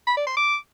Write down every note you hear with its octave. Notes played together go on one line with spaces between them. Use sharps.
B5
D5
C6
D6